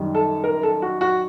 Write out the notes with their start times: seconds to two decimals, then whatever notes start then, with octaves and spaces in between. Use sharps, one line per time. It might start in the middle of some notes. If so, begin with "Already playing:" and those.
Already playing: F#2 D#3 G3
0.15 A4
0.44 A#4
0.63 A4
0.82 F#4
1.01 F#4